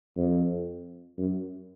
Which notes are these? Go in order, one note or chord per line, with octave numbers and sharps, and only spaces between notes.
F2
F#2